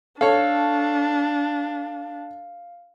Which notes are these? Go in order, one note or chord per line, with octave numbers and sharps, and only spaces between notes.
D4 A4 C#5 F5